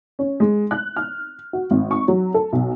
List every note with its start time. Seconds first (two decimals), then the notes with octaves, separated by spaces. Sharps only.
0.19 C#4
0.40 G#3
0.71 F#6
0.96 F6
1.53 F#4
1.71 G#1
1.91 C#6
2.08 F#3
2.34 A4
2.53 B1